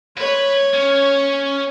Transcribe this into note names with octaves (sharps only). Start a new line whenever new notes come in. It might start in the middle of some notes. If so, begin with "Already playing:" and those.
B4 C#5
C#4